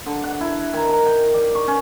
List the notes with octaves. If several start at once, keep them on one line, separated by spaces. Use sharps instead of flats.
D3
F#5
E4
D#3
A#5
G5
D5
C#6
C#4